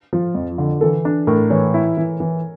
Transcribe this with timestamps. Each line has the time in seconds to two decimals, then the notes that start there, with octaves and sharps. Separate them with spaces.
0.13 F3 F4
0.35 F2
0.58 D3
0.81 E3 A4
1.05 D4
1.27 A2 A#4
1.50 E3 C#5
1.74 E4
1.97 E3
2.20 E3